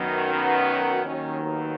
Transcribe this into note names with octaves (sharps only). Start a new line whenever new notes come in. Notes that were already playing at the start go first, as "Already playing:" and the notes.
Already playing: F#2 D#3 F#3 B3
B3
D#2 D#3 F#3 C#4
B3